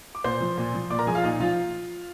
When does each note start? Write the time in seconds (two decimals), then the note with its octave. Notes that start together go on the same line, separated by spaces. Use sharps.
0.15 D6
0.24 A#2 C5 C6
0.41 F3
0.58 A#2
0.74 F3
0.90 A#2 D5 D6
0.99 A#4 A#5
1.07 F3 G#4 G#5
1.15 F4 F5
1.24 A#2 D#4 D#5
1.40 F3 F4 F5